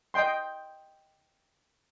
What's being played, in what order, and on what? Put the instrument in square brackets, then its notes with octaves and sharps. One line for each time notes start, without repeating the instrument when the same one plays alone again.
[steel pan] D#5 G5 C6